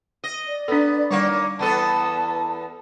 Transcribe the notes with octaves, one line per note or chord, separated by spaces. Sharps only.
D#5
D5
B3 D4 A4
D#3 G3 A#3 C#5 F#5 C#6
E2 B3 A4 A5